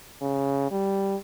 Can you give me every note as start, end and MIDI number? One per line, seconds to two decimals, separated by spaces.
0.21 0.67 49
0.71 1.16 55